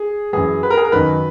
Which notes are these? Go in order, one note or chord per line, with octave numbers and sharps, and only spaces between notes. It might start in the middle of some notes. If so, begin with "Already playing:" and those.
Already playing: G#4
F#2 E3 G#4
B4
A#4
G#4
A#4
F#2 D#3 B4